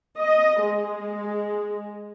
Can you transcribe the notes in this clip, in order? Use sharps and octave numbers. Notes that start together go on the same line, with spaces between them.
D#5
G#3